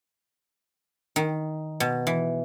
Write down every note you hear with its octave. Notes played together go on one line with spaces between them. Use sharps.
D#3
B2
E3